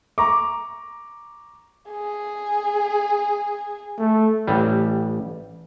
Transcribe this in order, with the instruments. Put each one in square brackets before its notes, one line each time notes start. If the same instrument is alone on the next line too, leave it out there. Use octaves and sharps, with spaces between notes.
[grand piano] A#5 C#6 D6
[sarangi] G#4
[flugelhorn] A3
[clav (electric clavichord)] A1 G3